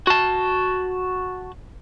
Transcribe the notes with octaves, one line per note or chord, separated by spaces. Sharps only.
F#4 A5